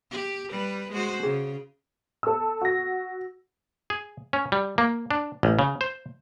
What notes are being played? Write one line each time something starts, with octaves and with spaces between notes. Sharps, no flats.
G4
G3 B4
G#3 F#4 C5
C#3 G#4
A4 E6
F#4 A#6
G#4
C#4
G3
A#3
D4
A1
C#3
C5